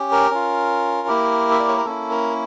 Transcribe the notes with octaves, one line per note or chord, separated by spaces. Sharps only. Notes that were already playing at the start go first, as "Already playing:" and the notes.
Already playing: C#4 G4
A#4
C#4 F4
A#3 E4 G4
E5
D5
C#5
A#4
A#3 C#4 E4 A4
A#4